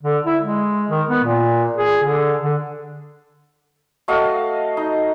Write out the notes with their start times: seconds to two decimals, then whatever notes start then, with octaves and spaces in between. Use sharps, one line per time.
0.03 D3
0.26 E4
0.42 G#3
0.90 D#3
1.09 B3
1.24 A#2
1.77 G#4
2.04 D3
2.43 D3
4.08 A3 F#4 D#5 F5
4.77 D#4